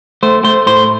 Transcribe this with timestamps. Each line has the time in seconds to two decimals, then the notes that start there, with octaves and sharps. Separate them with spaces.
0.23 A3 C5
0.44 A3 C5
0.67 A2 C5